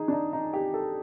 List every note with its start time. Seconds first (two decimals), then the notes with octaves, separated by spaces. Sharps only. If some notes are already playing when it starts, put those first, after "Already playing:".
Already playing: D#4 G#4
0.08 D4
0.13 D#4
0.33 D#4
0.53 G4
0.74 A4